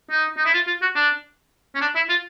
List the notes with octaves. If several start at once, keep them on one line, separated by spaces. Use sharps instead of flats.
D#4
D#4
E4
F4
F4
F#4
D4
C#4
D4
E4
F4